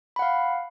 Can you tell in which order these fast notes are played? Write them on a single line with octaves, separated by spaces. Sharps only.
B5 F#5 F5